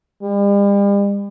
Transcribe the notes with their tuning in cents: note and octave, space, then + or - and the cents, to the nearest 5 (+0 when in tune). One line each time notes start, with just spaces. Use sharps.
G3 +45